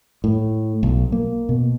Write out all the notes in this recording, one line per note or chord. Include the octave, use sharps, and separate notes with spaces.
A2
B1
A#3
B2